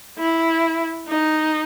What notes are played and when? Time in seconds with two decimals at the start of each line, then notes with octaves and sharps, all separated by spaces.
0.19 E4
1.09 D#4